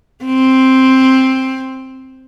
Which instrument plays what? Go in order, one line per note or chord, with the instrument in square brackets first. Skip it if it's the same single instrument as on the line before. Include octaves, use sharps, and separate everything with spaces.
[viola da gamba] C4